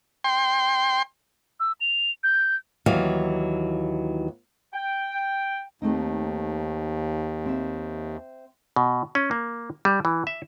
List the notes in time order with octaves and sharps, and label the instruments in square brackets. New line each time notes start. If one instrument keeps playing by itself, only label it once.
[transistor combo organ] G5 C6
[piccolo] E6
F7
G6
[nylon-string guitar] D#2 E3 F#3 F5
[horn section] G5
[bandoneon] D#2 [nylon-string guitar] A3 C4 D#4
[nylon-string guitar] C4 E5
[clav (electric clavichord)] B2
C#4
A#3
G3
E3
E5